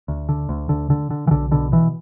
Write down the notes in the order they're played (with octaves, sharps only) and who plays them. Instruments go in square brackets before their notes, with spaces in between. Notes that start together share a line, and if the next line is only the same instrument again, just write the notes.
[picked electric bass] D2
D3
D2
D3
D3
D3
E3
B1 D3
B2 D3
B2 E3